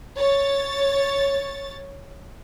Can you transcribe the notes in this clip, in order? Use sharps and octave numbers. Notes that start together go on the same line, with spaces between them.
C#5 A6